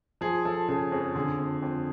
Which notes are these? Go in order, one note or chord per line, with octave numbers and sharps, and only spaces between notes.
F3 G#4
F3 A4
C#3 G#4
F2 G#4
D3 G#4
F2
F2